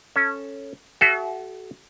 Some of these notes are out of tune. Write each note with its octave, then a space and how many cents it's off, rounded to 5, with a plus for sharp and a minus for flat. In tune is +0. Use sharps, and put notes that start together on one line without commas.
C#4 -5 A4 +0
F#4 +25 A4 -40 E5 +30